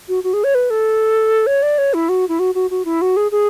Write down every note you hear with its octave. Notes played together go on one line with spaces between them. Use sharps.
F#4
F#4
G#4
C#5
B4
A4
C#5
D5
C#5
E4
F#4
E4
F#4
F#4
F#4
E4
F#4
G#4
G#4